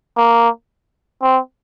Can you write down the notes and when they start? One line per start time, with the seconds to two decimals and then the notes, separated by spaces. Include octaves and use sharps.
0.17 A#3
1.22 C4